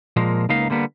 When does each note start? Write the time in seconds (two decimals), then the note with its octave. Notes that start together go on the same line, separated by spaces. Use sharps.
0.17 A#2 F3 G#3 A#3
0.49 C#2 A#3 B3 D#4 F5
0.70 D3 G3 A#3 B3